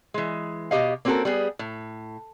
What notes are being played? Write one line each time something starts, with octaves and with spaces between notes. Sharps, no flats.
E3 G#3
B2 G4 D#5 F5
A#3 C4 C#4 F#4 A4 A#4
G3 B3 G#4
A2